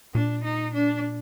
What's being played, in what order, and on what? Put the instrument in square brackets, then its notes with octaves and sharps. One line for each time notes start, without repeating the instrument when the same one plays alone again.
[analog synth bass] A#2 [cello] D4
[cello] D#4
D4